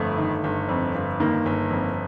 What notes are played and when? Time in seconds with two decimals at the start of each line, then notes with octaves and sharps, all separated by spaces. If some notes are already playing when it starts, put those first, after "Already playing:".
Already playing: G1 F2 A3
0.18 D#3
0.44 G1
0.69 F2
0.94 G1
1.20 D#3 A#3
1.46 G1
1.71 F2